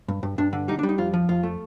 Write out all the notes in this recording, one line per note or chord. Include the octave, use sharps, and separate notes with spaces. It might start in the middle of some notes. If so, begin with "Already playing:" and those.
G2
G2
G2 D4
D3
G3 D#4
D4
G3
D#4
F2 F4
F3
F2 F4
A3